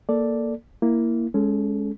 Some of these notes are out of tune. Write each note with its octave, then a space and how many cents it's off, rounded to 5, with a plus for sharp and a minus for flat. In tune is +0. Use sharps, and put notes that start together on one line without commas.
A#3 +0 A4 +0 D5 +0
A#3 +0 E4 +0
G#3 +0 C#4 +5 A4 -25